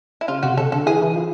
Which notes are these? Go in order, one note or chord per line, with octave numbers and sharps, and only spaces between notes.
E4
C#3 F4
C3 F#4
C#3 A4
D3 A4
E3 G#4
E3
F3